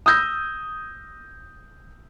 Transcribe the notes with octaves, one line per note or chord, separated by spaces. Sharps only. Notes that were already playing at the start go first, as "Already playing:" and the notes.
D#6 E6 G6 A#6